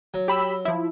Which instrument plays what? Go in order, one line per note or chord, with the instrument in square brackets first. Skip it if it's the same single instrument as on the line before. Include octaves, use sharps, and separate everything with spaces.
[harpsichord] F#3
[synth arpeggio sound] G4 B5 E6
F3 E4